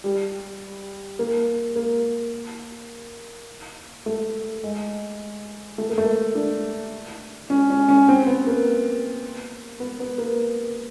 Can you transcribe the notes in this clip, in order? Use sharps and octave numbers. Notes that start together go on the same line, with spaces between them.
G3
A#3
A#3
A3
G#3
A3
A#3
A3
D4
C#4
C#4
C#4
C4
B3
A#3
B3
B3
A#3